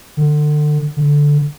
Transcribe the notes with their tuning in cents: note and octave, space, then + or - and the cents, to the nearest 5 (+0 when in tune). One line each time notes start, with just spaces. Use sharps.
D3 +30
D3 -5